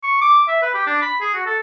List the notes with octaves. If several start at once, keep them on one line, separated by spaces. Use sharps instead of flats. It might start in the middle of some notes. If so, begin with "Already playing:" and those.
C#6
D6
E5
B4
G4
D4
B5
G#4
F#4
A4